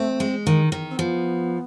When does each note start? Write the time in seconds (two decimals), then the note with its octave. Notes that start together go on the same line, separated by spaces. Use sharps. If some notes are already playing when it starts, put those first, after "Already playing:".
Already playing: A3 C4
0.20 G#3
0.47 D#3
0.72 D#3
0.91 C4
0.98 F3 B3